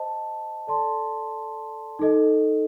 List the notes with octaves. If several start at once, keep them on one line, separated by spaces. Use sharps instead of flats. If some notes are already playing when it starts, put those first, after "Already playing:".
Already playing: C5 D#5 A5
A4 D5 A5 C6
D#4 A4 D#5